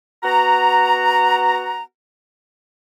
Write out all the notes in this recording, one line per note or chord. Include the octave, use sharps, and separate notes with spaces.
B3 F#4 F#5 A#5